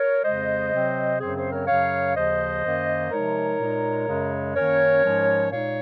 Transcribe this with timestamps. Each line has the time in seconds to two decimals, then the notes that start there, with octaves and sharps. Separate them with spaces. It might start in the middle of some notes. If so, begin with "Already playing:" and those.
Already playing: A#4 C#5
0.24 F2 C#3 G#3 C5 D#5
0.72 C3 F#3 C4
1.20 F#2 C#3 F#3 C4 G#4 C5
1.36 G#4 C5
1.51 A#4 C#5
1.67 F#2 C#3 F#3 C#5 F5
2.15 D#2 C#3 F3 C5 D#5
2.64 F#2 D#3 A#3
3.11 C3 F3 G#3 D#4 A#4 C#5
3.59 A#2 G#3 D#4
4.07 F#2 C#3 G#3
4.55 F#2 D#3 A#3 C#4 A#4 C#5
5.02 G#2 F3 G#3 C#4
5.50 A#2 G#3 D#4 C#5 F5